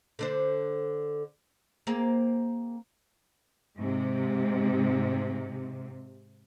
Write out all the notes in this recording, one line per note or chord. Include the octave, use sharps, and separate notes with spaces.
D3 D4 C5
A#3 C4 G#4
G#2 C3